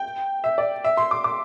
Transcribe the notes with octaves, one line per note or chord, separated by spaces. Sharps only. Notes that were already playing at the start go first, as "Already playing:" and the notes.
Already playing: G5
E5
D5
E5
C6
D6
D6